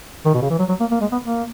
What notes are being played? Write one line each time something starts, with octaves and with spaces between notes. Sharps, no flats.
D#3
B2
C#3
E3
F#3
F#3
A#3
A#3
G#3
B3
A#3